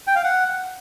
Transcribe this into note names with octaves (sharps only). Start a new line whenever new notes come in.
G5
F5
F#5